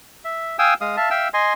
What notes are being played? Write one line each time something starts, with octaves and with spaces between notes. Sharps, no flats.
E5
F5 G5 G#5 D#6 E6
G#3 F5 D#6
E5 F5 A5
E5 F5 G5 E6
D#5 G#5 C6